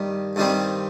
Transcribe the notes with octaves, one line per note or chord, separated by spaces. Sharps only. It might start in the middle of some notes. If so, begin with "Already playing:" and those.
Already playing: G2 D#3 G3
G2 D#3 G3 C4